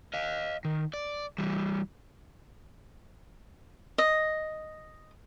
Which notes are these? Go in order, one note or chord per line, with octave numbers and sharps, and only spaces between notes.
D#5 F5
D#3
D5
E3 G3
D#5